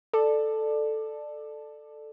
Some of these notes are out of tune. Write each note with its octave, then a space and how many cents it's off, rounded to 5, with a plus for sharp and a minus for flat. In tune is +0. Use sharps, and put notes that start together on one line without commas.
A4 +0 D5 +20